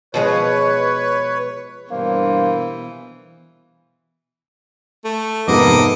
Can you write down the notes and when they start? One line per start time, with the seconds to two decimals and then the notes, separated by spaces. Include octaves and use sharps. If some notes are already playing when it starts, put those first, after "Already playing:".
0.14 B2 F3 G#3 B4 C#5
1.91 G2 B2 E3 A#3 C5
5.04 A3
5.48 F2 G#2 C3 A#3 B3 A4 D#5 D6